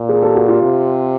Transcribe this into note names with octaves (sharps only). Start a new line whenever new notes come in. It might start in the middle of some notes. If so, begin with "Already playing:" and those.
Already playing: A#2
G#4 A#4
G4 A4
F#4 G#4
F4 G4
C3